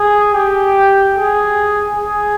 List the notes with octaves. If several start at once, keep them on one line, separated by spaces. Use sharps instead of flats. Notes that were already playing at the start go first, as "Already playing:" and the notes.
Already playing: G#4
G4
G#4
G#4